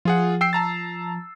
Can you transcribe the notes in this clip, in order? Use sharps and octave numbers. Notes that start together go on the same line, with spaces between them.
F3 F4 G#4 F#5
G5 E6 C7
A5 A#5 A6